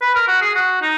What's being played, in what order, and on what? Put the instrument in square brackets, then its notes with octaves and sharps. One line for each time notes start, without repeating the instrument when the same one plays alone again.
[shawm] B4
A#4
F#4
G#4
F#4
D#4